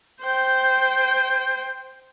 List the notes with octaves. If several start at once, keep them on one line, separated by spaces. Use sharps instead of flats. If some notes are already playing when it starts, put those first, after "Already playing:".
C5 G5